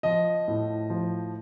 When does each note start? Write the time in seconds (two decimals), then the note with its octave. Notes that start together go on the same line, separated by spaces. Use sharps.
0.03 F3 D#5
0.48 A2
0.90 F3